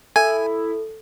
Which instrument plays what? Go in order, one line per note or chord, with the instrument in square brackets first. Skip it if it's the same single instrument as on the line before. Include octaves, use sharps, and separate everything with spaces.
[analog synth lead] E4 [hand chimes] A4 [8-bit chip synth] G#5